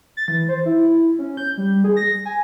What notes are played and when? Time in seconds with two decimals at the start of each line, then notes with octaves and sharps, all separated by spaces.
0.17 A6
0.28 E3
0.49 C5
0.65 E4
1.19 C#4
1.37 G6
1.57 G3
1.84 G#4
1.97 A#6
2.25 G#5